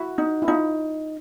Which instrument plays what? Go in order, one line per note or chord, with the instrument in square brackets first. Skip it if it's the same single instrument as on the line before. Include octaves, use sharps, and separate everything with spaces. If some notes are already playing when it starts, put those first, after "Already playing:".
Already playing: [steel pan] E4 [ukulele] F#4
[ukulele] D#4
[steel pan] E4
[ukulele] D#4 [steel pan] F4